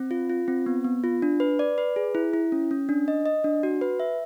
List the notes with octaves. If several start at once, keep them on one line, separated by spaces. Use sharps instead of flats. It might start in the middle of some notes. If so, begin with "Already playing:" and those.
Already playing: C4
F4
F4
C4
B3
B3
F4
D4
B4
D5
B4
G#4
E4
E4
C#4
C#4
D4
D#5
D#5
D4
F#4
B4
E5